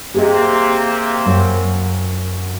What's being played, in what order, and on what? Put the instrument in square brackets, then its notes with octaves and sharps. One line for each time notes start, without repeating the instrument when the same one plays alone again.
[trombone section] C3 A#3 C4 [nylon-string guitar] G4 G#4 D#5
[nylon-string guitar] F#2